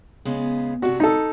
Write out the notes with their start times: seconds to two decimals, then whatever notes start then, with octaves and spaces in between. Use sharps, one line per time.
0.25 C#3 G#3 B3
0.82 C3 D4 F#4
1.00 D#4 A4